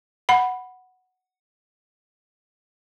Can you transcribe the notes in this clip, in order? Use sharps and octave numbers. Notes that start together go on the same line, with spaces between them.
F#5 B5